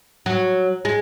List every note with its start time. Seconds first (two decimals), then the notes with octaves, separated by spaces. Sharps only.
0.26 F#3
0.85 G#3